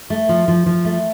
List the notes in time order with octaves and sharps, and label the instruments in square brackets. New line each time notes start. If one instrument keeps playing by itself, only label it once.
[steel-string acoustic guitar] A3
F3
F3
F3
A3